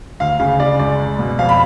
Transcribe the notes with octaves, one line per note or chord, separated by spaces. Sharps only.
D2 F5
C#3 F5
C#3 D5
C#2 D5
C#2
B2
F2 F5
B5